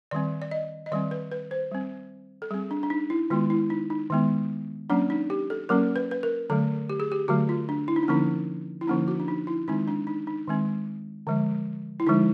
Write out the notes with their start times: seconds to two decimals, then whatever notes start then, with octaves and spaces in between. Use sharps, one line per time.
0.11 D#3 G3 C4 D5
0.42 D5
0.51 D#5
0.86 D#5
0.92 D#3 G3 C4 D5
1.11 B4
1.31 B4
1.51 C5
1.71 G3 C4
2.42 A4
2.51 G3 C4 G#4
2.71 D4
2.83 D4
2.90 D#4
3.10 E4
3.30 D#3 G#3 B3 F4
3.50 E4
3.70 D#4
3.90 D#4
4.10 D#3 G#3 B3
4.90 F#3 A#3 C#4 D4
5.10 D#4
5.30 G4
5.50 A4
5.69 F#3 A#3 C#4 A#4
5.96 B4
6.11 B4
6.23 A#4
6.50 D3 F#3 A3 A4
6.90 G4
7.00 G#4
7.12 G4
7.28 D3 F#3 A3 F#4
7.49 F4
7.69 D4
7.88 E4
7.96 D#4
8.03 D4
8.08 D3 F3 A#3 C#4 D#4
8.81 E4
8.87 D3 F3 A#3 C#4 D#4
9.08 F#4
9.20 D4
9.28 D#4
9.47 E4
9.68 D#3 G#3 C4 D#4
9.88 D4
10.07 D#4
10.27 D#4
10.47 D#3 G#3 C4
11.27 D3 F3 G#3
12.00 E4
12.07 D3 F3 G#3 D#4